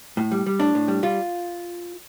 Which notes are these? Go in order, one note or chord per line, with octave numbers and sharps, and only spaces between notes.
A2
G3
G3
A2 D4
A2
G3
G3 F4